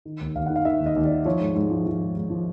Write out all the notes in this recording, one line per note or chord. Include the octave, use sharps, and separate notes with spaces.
D#3
D#2
D#2 F5
D#3 F#5
F5
D#3 E5
D#2
D#5
D#2
D#3 D5
F3 C#5
G#2
G#2
F3
F3
G#2
G#2
F3